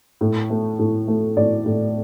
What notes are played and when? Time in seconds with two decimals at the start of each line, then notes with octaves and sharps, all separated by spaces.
0.21 A2
0.50 A3
0.79 A2
1.08 A3
1.37 A2 D5
1.66 A2